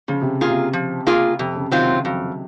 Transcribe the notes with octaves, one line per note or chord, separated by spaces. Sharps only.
C#3 F3
C3
A#3 F4 G#4
C3
F3
A#3 F4 G#4
F2 C3
C#3
C3 D#3 F#3 C4 F4
C#3
F2 F#3